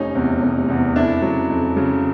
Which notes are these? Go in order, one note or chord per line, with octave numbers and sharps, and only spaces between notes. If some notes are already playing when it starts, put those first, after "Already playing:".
Already playing: F1 C#4 D#4
E2 C3
F1
E2 C3
F2 D4 E4
C#3 F#3
F2
C#3 F#3